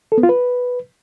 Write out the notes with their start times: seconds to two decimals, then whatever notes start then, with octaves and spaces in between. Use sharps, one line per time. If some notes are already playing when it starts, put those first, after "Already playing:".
0.12 A4
0.18 B3
0.23 F4
0.29 B4